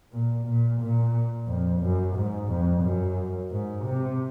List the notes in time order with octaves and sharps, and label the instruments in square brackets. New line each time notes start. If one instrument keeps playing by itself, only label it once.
[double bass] A#2
A#2
A#2
F2
F#2
G#2
F2
F#2
G#2
C3